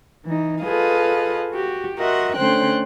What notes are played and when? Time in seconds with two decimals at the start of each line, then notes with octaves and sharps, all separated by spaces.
0.25 E3 D#4
0.63 F4 G#4 A4 B4 D#5 F5
1.52 F#4 G4
1.97 F#4 A#4 D#5 E5 F#5 C6
2.35 D3 A3 C#4 C5 G5 F#6